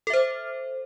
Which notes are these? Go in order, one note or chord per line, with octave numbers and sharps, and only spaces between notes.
A4 C5 E5